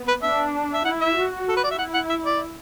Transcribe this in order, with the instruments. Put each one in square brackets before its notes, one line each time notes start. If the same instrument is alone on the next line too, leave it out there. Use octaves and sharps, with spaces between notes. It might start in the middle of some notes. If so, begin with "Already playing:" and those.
Already playing: [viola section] B3
[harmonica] B4
[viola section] D4 [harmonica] E5
[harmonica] E5
[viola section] E4 [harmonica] F#5
[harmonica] E5
[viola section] F#4
[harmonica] A4
B4
D5
E5
[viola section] E4 [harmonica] F#5
[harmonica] F#5
E5
D5